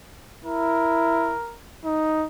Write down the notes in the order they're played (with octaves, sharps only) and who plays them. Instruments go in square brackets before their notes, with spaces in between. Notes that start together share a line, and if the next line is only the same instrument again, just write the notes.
[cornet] E4 [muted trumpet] A#4
[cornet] D#4